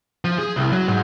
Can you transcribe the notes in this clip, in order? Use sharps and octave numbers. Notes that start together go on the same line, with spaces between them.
F3
G#4
C2
F#3
G#2